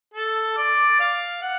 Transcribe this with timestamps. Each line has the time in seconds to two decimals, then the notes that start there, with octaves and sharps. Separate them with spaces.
0.14 A4
0.57 D5
1.00 F5
1.42 F#5